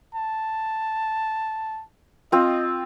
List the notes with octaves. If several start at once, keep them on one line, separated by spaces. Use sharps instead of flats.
A5
C4 F4 D#5